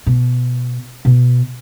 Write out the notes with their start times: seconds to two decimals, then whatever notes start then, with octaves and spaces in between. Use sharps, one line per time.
0.06 B2
1.05 B2